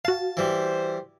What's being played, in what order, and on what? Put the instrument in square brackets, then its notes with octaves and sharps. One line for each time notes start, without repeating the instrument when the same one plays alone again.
[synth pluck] F#4 F5 [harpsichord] A5
[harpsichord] E3 G3 [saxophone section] C5